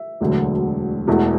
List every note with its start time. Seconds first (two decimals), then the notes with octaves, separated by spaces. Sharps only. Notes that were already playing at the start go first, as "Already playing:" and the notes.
Already playing: E5
0.21 E1 D2 D3 F#3
1.07 E1 E2 B2 A3